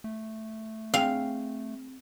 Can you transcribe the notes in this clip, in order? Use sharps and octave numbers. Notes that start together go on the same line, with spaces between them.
A3
C4 G#4 F5 G5